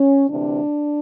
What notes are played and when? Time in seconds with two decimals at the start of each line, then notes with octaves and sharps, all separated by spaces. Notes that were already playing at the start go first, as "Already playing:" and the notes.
Already playing: C#4
0.29 D2 C3 E3 D4